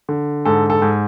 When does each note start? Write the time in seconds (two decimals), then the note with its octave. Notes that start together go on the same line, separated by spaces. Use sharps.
0.09 D3
0.45 G#2 A4
0.70 A4
0.82 G#2